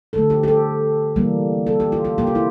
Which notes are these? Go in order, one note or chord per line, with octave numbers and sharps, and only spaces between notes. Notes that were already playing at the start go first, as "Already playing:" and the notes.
D3 F3 A3 A4
G4
G4
A4
C3 E3 G3 A#3
A4
G4
F4
F4
C3 F3 A#3 G4
F4
E4